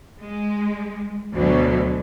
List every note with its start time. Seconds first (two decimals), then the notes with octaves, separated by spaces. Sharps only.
0.20 G#3
1.34 D2 B2 F#3